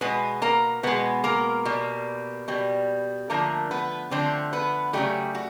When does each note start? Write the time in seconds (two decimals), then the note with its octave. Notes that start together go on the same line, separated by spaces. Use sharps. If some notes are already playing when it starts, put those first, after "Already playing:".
0.01 B2 G#3 B3 B4
0.42 A#3 A#4
0.83 B2 G#3 B3 B4
1.24 A#3 A#4
1.65 B2 G3
2.48 B2 G3
3.30 D3 F3 A3 A#3 A#4
3.71 B3 B4
4.11 D3 F3 A3 C4 C5
4.52 B3 B4
4.93 C#3 F#3 G3 A3 G4
5.35 F#4